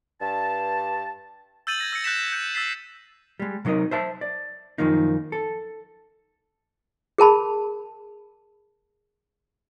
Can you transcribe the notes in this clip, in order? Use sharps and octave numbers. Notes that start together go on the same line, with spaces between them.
G2 A5
E6 G6 A6 D#7 F#7
G#6 A#6
E6 A#6 C#7
F#6 G6 A6 B6 E7
G6 C#7
E6 A6 B6 C7
G3 G#3
C3 F#3 D#4 A#4 D#5
C5 E5 A5
D5
F#2 D#3 F3 A#3 D#4
A4
G#4 A#4 A5 B5